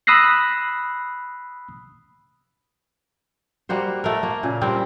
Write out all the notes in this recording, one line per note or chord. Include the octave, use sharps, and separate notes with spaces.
B5 D#6 E6 F#6 A#6 C7
G3 A#3 F#4 C5
A3 A#4
A#3
A#2 C#3
G3 C4 D4 A#4